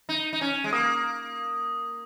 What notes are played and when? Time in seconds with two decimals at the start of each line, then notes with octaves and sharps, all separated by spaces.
0.09 D#4
0.33 D#4
0.41 C#4
0.64 G#3
0.73 A#3 D#6